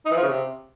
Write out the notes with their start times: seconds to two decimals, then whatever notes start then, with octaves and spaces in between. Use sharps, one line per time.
0.06 D#4
0.11 E3
0.17 F3
0.22 C#3
0.28 C3